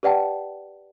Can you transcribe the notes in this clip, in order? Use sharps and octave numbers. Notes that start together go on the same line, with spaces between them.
G4 B4 D5 F#5 G5 A5